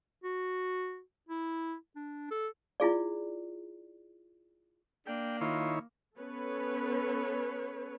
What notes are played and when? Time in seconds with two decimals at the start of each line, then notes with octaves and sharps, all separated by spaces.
0.24 F#4
1.29 E4
1.96 D4
2.31 A4
2.80 E4 F4 G#4 D5
5.07 A#3 D4 G5
5.41 D#3 E4 F4 C#5
6.19 B3 C#4 A4 B4 C#5